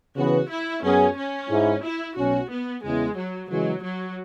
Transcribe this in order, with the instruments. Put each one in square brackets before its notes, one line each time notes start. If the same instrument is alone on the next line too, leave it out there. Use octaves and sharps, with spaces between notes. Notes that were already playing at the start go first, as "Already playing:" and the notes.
[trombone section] C#3 E3 B3 [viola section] F#4
[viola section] E4
[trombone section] F#2 F#3 B3 G#4 [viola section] C#4
[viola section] C#4
[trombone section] G#2 G#3 E4
[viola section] E4
[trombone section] B1 B2 F#3 C#4 [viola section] F#4
[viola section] B3
[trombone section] E2 C#3 E3 B3 [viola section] G#3
[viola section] F#3
[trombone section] C#3 E3 G#3 [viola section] F#3
[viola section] F#3